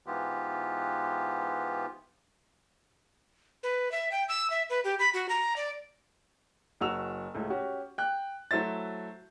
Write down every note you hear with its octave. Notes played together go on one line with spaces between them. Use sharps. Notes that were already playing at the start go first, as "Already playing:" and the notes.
G#2 E3 B3 F4 G4
B4
E5
G5
E6
E5
B4
G4
B5
F#4
A#5
D5
F#1 F#3 F#4 E6 F7
C#2 A2 A3
C#4 F#4 G4
G5 F#6
F#3 A3 E4 C5 E5 A6